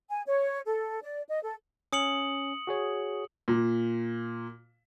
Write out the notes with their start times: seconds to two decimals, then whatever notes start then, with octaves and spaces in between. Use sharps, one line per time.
0.11 G#5
0.27 C#5
0.67 A4
1.02 D5
1.29 D#5
1.42 A4
1.93 C#4 D#6 C#7 F#7
2.67 F#4 G#4 C#5
3.48 A#2